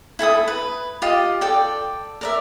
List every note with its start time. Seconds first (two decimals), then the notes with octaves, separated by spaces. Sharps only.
0.19 E4 A4 G#5 D#6
0.48 B4
1.02 F4 G4 D#5
1.41 A4 D5 G5
2.21 A#4 D5 E5